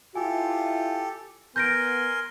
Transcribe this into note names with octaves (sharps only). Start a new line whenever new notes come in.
E4 F4 G4 A4 G#5
B3 A#4 G#5 C6 G6 A#6 D7